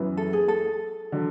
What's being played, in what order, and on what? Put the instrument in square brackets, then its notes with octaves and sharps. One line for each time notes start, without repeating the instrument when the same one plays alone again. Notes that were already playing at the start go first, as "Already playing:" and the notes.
Already playing: [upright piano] F#2 E3 B3
[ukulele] A4
G#4
A4
[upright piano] D3 F#3